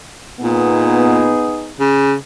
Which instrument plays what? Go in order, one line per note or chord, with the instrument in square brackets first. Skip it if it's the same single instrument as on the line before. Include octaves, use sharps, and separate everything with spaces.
[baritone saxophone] A#2 [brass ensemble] B3 D#4 G#4
[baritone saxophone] C#3